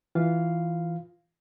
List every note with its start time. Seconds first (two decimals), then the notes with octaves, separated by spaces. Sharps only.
0.15 E3 F4 F5